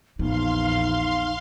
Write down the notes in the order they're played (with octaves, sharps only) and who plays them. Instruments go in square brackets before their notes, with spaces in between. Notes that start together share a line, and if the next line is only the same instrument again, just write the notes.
[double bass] A#1 E2 [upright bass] B3 [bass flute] D#4 [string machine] F5 C6